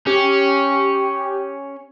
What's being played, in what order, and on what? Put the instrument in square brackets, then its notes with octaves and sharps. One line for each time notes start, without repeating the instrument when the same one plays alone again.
[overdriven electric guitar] C#4 [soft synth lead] G4